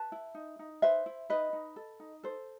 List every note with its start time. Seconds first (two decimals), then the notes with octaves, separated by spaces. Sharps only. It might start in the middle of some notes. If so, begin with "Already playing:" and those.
Already playing: B4 A5
0.12 E4
0.35 D#4
0.59 D#4
0.82 B4 C5 E5
1.06 E4
1.30 D#4 B4 D#5
1.53 D#4
1.76 A4
2.00 D#4
2.23 A4 C5